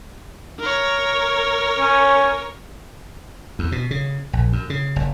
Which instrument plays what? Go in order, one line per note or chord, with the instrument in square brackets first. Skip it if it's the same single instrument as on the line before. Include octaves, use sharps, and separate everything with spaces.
[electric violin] A#4 C#5
[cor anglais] C#4
[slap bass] E2
B2
C#3
A#1
F#2
C#3
F#1